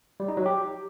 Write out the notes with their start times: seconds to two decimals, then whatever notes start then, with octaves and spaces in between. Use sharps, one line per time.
0.20 G3
0.28 D#4
0.37 F#3
0.46 G4